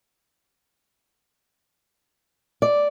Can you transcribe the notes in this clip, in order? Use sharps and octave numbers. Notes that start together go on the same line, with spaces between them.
D5